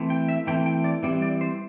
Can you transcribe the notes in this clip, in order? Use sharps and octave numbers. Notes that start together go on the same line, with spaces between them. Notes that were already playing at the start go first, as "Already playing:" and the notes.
Already playing: E3 A3 C4
G5
E5
E3 A3 C4 G5
G5
D5
E3 G3 C4 D5
D5
C5